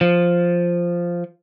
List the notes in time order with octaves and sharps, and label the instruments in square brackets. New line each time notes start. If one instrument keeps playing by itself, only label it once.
[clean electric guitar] F3